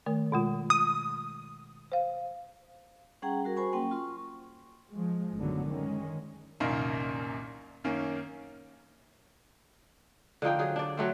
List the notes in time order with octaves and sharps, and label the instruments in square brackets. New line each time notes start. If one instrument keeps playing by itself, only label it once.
[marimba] D#3 A3 A#4
B2 G#3 F4
[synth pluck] D#6
[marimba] C5 F5
[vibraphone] G3 C#4 G#4 F#5 G5 A#5
G3 F#4 A#4
F#4 C5 G#5 B5 C#6
F#3 A#3 C#4 G5 C6
F4 C6 C#6
[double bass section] F3 G#3
A1 F#2 D3 D#3 F#3 B3
D#3 G#3 C#4
[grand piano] C2 F#2 A#2 D#3 A#3 D#5
F#2 D#3 A#3 C#4
[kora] D3 F3 D#4 G5
F#3 G#4
D4 D5
F#3 A3 C4